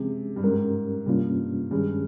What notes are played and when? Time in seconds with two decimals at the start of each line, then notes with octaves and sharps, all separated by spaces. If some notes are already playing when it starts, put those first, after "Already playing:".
Already playing: C3 F3 G#3 C#4 G#4
0.36 G2
0.42 G#2 G3 C#4 G4 A#4
1.06 G2 C3 G3 A#3 C#4 F4
1.71 G2 D#3 G#3 C#4 G#4